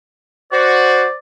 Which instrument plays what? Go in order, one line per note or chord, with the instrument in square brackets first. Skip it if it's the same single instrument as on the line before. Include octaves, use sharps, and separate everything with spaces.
[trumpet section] F#4 [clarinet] C5 [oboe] D5